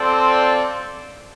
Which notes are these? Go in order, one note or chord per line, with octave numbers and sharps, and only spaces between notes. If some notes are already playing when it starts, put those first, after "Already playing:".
Already playing: C4 F4 A4 D5